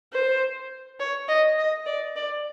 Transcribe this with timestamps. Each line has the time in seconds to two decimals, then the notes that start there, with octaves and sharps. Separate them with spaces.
0.13 C5
1.00 C#5
1.28 D#5
1.58 D#5
1.87 D5
2.16 D5